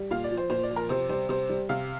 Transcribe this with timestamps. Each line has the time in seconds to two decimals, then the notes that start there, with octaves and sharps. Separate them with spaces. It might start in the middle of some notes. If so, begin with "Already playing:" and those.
Already playing: G3
0.11 A#2 F5
0.24 D5
0.31 F3
0.37 C5
0.50 A#2 C5
0.63 D5
0.71 F3
0.76 A#4
0.89 C3 C5
1.09 G3 C5
1.29 C3 C5
1.49 G3
1.69 C3 F5